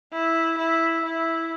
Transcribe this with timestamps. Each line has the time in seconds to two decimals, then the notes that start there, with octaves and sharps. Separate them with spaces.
0.13 E4
0.58 E4
1.05 E4